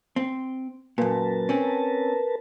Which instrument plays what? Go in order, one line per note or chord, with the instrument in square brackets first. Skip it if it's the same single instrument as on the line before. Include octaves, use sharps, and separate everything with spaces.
[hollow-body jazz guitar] C4
[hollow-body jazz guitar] F#2 A#2 [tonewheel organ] A#4 B4 A5
[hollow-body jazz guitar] C4 C#4